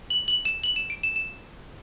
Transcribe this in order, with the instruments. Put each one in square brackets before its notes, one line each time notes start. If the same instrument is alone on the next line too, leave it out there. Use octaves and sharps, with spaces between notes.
[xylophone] F#7
F#7
E7
F#7
E7
D7
E7
E7